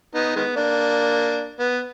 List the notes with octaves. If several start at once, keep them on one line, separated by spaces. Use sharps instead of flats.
B3 D#4
D#3 G#3 B3
A#3 D4
B3